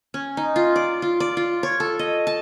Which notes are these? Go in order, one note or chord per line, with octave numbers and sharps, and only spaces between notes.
C#4
D#4
F4
D5
F4
D5
F4
C#5
A4
D#5
A5